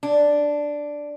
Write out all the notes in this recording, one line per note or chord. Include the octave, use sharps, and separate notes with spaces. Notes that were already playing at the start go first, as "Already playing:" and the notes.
D4